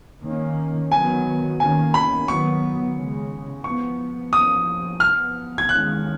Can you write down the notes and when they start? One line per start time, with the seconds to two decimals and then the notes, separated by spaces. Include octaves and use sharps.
0.24 D#3 A#3 C#4
0.92 D#3 F#3 B3 G#5
1.60 D#3 A#3 C#4 G#5
1.94 B5
2.28 D#3 F#3 B3 C#6
2.96 C#3 G#3 C#4
3.64 F3 B3 C#6
4.33 F3 A#3 C#4 D#6
5.00 F3 B3 F6
5.58 G#6
5.69 D#3 G#3 C#4 F#6